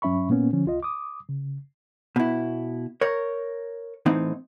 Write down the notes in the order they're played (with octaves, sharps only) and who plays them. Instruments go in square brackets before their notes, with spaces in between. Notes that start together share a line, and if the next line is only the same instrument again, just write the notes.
[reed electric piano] G2 F#3 C#4 E5 B5 C#6
A#2 A#3 B3 C#4
D3 F3 C#4
C2 F4 D#5
D6 D#6
C#3
[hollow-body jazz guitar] B2 E4
A#4 C#5
A2 E3 C4 D#4